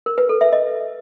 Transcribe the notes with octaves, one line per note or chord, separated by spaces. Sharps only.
A#4
B4
A4
E5
D#5